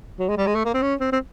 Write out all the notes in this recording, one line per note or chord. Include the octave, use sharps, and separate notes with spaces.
F#3
G#3
G3
G#3
A3
A#3
C4
C#4
C4
C4